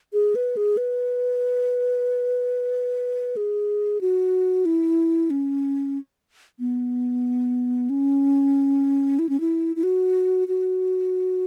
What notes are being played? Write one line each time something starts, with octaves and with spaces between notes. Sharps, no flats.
G#4
B4
G#4
B4
G#4
F#4
E4
C#4
B3
C#4
E4
C#4
E4
E4
F#4
F#4